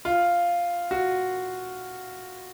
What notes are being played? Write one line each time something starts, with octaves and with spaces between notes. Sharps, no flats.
F4
F#4